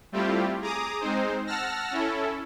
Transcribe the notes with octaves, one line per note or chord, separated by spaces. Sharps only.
G3 A3 C4 E4 F4 G4
G#4 A#5 D6 D#6
G#3 C4 D#4 C5
F#5 A5 E6 F6 A#6
C#4 E4 A4